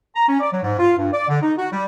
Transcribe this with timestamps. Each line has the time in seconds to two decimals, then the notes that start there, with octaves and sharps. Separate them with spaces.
0.15 A#5
0.28 C#4
0.40 D5
0.52 F#3
0.64 G#2
0.79 F4
0.96 G2
1.12 D5
1.28 D3
1.41 D#4
1.58 F#4
1.72 G3